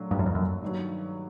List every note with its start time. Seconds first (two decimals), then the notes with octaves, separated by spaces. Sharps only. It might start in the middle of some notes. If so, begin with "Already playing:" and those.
Already playing: A#2 F#3 A3 D4
0.11 G2
0.19 F#2
0.26 F2
0.35 F#2
0.62 G2 D#3 F#3